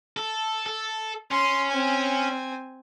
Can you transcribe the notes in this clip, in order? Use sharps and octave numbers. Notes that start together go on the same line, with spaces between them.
A4
A4
C#4 C6
C4 G#5